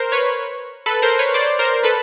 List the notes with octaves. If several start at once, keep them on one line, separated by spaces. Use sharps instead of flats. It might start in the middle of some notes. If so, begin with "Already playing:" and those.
Already playing: A#4 C5
B4 C#5
A4 B4
A#4 C5
B4 C#5
C5 D5
A#4 C5
A4 B4